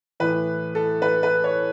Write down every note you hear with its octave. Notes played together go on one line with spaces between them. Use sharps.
A2 E3 B4
A4
B4
B4
C#5